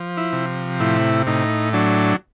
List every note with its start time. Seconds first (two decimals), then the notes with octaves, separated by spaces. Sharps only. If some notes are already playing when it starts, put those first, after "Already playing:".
Already playing: F3
0.17 E4
0.33 C3
0.80 A2 E4
1.27 A2 D#4
1.73 F#3 D4